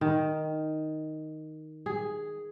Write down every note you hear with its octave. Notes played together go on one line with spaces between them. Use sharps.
D#3
G#4